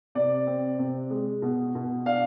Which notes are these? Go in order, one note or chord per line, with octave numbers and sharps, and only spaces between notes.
C3 D5
C4
C3
G#3
B2
B2
D4 F5